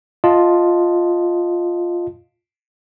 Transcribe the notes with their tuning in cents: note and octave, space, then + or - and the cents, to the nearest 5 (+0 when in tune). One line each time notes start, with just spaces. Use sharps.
F4 +0 D#5 +0 A5 +0